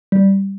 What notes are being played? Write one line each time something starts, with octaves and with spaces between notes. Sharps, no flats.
G3